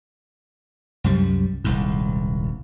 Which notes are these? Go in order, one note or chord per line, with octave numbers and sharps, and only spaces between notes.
C2 F#2 G3
D#1 C2 G#2